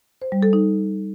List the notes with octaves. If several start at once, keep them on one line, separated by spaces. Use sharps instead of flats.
C5
G3
A4
D#4